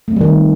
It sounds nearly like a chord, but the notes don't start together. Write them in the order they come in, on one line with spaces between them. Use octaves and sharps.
A3 C4 G3 D#3